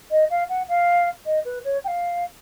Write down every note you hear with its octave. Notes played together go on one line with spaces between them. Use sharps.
D#5
F5
F#5
F5
D#5
B4
C#5
G5
F5